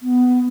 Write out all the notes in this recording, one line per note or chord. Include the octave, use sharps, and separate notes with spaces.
B3